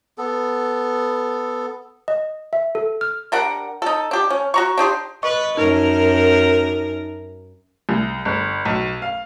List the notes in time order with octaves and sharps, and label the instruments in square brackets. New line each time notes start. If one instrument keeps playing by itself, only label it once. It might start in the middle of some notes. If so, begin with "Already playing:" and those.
[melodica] B3 A4
[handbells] D#5
E5
A4
F6
[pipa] G3 D4 A#4 F#5
D#4 A4
D4 G4
C#4
F#4 A#5 C#6
D4 D#4 G4 C6
[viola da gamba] B4 [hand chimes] D#5 C#6
[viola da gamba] F#2 A#4 [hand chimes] D#4
[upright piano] C2
G1
B1
F5